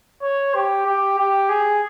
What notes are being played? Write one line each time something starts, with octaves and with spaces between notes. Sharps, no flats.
C#5
G4
G4
G4
G#4